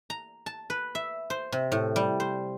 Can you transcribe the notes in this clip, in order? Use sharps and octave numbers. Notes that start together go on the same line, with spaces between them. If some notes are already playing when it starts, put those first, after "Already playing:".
A#5
A5
B4
E5
C5
C3
A2
G3
C5